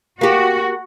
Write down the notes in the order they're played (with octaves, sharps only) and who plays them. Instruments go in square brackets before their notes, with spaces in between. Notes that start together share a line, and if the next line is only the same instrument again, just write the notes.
[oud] A#3 G4 [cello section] F#4